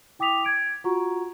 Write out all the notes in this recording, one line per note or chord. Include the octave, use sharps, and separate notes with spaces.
E4 G5 D6 D#6 B6 F7
G#6 D7
F4 F#4 F#5 A#5 C#6